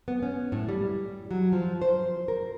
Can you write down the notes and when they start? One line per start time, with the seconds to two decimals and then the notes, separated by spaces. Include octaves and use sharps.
0.08 B3
0.23 C#4
0.52 A2
0.69 G3
1.31 F#3
1.52 F3
1.82 C5
2.28 A#4